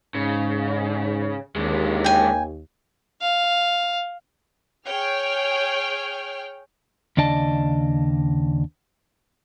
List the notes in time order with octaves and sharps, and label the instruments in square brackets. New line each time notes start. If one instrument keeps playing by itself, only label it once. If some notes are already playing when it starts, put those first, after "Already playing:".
[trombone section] G#2 [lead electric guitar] C#3
[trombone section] D#2 [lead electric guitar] D3 G#3
[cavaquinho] G5 G#5
[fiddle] F5
[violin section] G#4 C#5 G5 F6
[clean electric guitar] D#2 C#3 D4 D5 D#5 A5